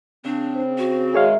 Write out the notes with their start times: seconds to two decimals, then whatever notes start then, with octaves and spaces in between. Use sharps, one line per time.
0.25 C#3 C4 D4
0.55 C5
0.78 F#4
1.14 D#3 G#3 G#4 C#5 E5 F5